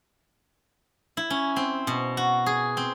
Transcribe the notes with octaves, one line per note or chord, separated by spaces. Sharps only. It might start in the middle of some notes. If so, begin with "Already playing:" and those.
E4
C#4
C4
B2
F#4
G#4
C4